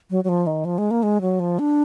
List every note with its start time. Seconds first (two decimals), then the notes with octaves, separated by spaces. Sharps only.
0.10 F#3
0.24 F#3
0.29 F3
0.47 D#3
0.65 F3
0.78 G#3
0.91 A#3
1.03 G#3
1.21 F#3
1.40 F3
1.59 D4